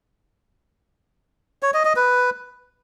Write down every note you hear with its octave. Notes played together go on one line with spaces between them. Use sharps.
C#5
D#5
D#5
B4